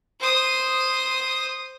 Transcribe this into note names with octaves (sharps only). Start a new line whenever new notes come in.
C5 D#6